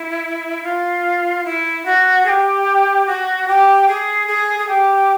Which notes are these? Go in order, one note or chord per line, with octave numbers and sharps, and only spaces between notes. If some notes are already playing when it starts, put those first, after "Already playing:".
Already playing: E4
F4
E4
F#4
G#4
G4
F#4
G4
G#4
G#4
G#4
G4